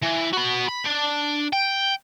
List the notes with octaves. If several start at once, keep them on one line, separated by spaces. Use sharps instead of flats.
E3
F#4 B5
B5
D4
G5